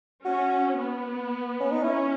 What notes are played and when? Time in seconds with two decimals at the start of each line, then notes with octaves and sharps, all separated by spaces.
0.25 C#4 F#4
0.77 B3
1.60 C#4
1.72 D#4
1.83 C#4 E4